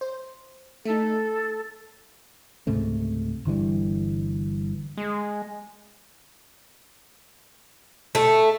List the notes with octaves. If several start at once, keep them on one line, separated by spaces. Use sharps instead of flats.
C5
A3 D#4 A4
C#2 G#2 C3 A3
G1 D3 E3 G3
G#3
A3